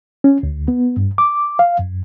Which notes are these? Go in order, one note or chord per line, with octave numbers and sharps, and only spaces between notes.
C#4
D2
B3
G2
D6
F5
F#2